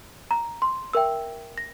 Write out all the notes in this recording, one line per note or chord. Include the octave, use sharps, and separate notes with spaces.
A#5
C6
A#4 E5 G5 E6
A#6